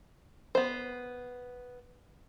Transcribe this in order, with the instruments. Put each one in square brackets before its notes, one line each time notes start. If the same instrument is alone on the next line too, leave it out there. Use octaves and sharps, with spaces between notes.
[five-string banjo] B3 C5